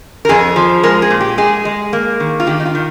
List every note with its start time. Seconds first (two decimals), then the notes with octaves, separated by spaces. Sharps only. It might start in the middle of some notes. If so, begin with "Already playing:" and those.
0.25 A#4
0.29 F2 G#4
0.56 F3
0.83 G#3 A#4
1.02 G#4
1.10 A#2
1.20 G4
1.38 G#3 G#4
1.65 G#3
1.93 A#3
2.20 D#3
2.40 F4
2.47 D#3 G4
2.60 D#4
2.65 F4
2.75 D#3